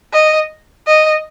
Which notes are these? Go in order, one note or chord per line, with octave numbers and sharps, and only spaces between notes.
D#5
D#5